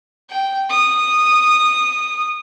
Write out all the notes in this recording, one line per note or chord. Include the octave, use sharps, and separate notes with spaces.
G5
D#6